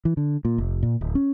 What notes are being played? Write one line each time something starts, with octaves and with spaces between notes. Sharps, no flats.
E3
D3
A#2
F1
A#2
D1
C#4